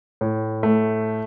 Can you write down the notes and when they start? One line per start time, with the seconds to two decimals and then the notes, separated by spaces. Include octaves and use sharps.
0.21 A2
0.63 A3